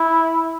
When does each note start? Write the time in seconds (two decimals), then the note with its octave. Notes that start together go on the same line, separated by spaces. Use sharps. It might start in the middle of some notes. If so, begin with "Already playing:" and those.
Already playing: E4